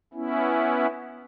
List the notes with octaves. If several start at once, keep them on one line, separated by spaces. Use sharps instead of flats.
B3 C#4 E4